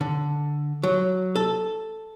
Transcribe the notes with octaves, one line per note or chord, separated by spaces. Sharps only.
D3
F#3
A4